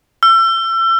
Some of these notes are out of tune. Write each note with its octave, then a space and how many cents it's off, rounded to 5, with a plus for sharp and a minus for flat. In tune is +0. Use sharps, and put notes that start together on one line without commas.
E6 +35